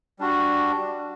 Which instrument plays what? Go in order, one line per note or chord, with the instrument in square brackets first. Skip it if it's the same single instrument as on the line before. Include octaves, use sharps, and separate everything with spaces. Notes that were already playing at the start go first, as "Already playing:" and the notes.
[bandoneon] G3 D4 F#4